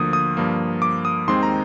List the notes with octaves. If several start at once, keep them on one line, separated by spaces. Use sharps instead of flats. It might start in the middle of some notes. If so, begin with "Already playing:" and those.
Already playing: D2 D3 F3 A#3 D#6
D#6
G2 F3 A#3
D6
D#6
D#2 D#3 G#3 C4 C6
A#5